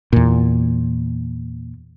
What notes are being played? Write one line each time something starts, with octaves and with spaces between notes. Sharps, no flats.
E2 A#2